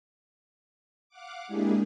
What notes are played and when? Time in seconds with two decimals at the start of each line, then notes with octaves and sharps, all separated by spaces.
1.09 F5 F#5 D6
1.48 G#3 A#3 D4 E4 G4 G#4